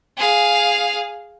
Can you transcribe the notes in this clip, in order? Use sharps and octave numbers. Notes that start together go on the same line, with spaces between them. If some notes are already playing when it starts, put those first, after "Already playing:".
G#4 F5